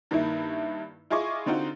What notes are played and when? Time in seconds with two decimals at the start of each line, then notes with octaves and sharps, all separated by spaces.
0.11 G2 D#3 A#3 D#4 E4
1.10 E4 F4 G#4 D#5 C#6 D6
1.46 D3 C4 D#4 F4 F#4